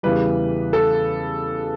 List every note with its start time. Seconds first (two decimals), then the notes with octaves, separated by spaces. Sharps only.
0.03 E2 C#3 E3 G3 B4
0.73 A4